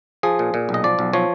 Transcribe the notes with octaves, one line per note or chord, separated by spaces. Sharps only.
F3 G#4
A#2
A#2
B1
D#5
F3 D5
B1
F3 C#5